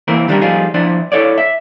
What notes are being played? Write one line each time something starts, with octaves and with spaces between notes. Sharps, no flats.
E3 A#3 C4 E4 A#4
D#3 G3 D4 F#4 G4 A#4
F3 G3 A3 D#4 F4 G#4
F3 D4 E4
E4 A4 C#5 D5
E5